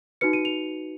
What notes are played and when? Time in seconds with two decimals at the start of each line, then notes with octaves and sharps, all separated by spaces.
0.21 D#4 F#4 B4 C#7
0.33 D#7
0.45 F7